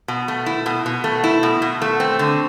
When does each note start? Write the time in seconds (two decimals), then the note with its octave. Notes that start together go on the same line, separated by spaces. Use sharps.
0.08 B2
0.28 A3
0.46 E4
0.66 B2
0.86 B2
1.04 A3
1.24 E4
1.43 B2
1.62 B2
1.82 A3
2.00 C4
2.19 D3